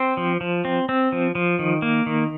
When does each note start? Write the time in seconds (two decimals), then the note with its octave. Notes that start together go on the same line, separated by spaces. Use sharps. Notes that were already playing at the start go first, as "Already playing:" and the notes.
Already playing: C4 C5
0.17 F3
0.41 F3
0.65 C4
0.89 C4
1.12 F3
1.35 F3
1.59 D#3
1.82 A#3
2.06 D#3